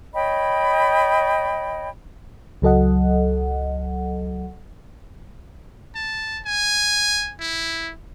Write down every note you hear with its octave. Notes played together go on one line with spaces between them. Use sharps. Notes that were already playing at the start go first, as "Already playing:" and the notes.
C#5 D#5 G5 B5
C#2 F#3 A4 D#5 F#5
A5
G#5
E4